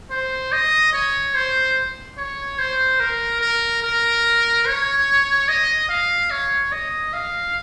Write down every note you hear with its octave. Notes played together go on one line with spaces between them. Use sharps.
C5
D#5
C#5
C5
C#5
C5
A#4
A#4
A#4
C#5
D#5
F5
C#5
D#5
F5